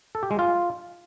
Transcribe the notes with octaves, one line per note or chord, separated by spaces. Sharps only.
A4
G4
G#3
F4